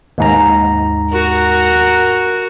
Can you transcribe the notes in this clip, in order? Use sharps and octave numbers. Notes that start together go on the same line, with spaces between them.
D#2 G#2 A#5
F#4 A#4